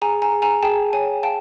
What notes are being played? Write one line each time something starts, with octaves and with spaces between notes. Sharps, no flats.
G#4 G#5 A#5
G#5 A#5
G#4
G#5 A#5
G#4 G5 A5
C#5 G#5
F5 G5 A5